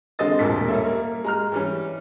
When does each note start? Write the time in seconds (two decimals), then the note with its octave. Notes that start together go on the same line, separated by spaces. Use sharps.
0.19 D3 G#3 C4 D#5 D#6 A6
0.39 E1 A1 A#2 A#3 A5 B6
0.68 G3 A#3 C#4 A4 E5
0.84 A#3
1.24 G#3 A#5 F6
1.52 E3 G3 C#4